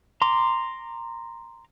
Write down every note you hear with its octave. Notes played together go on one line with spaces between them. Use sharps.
A#5 C6 D6